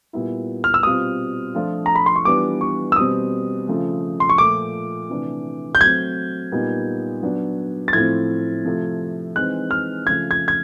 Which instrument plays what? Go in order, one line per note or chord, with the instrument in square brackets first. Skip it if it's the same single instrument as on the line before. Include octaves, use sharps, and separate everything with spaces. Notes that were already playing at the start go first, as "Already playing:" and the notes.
[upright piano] A#2 G3 B3 E4
[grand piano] F6
E6
[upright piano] B2 G3 C4 F4 [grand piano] D#6
[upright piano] F3 A3 D4 F4
[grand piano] A#5
B5
C6
C#6
[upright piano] E3 G3 B3 D4 F4 [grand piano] D6
[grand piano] C#6
E6
[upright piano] B2 G3 C4 [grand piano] D#6
[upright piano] C#3 F3 A3
[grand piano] C6
C#6
[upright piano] A#2 F3 A3 [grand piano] D6
[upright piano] C3 E3 A3 D4
[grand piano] G6
[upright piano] F#3 A3 C4 [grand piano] G#6
[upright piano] A#2 G3 B3 D#4
F#3 B3 D4
[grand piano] A6
[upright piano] A2 F3 A3 C4 [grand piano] G#6
[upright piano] C3 F3 A3
[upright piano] E3 G#3 C4 D#4 [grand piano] F#6
[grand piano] F6
[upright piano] C#3 F3 A3 [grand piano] G#6
[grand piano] G#6
G#6